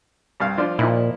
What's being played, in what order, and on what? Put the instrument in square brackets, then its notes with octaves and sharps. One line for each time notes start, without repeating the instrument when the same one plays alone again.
[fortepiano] C2 G2 F5
F3 D4 F4
[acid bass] A#2 [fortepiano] F3 D#4 E4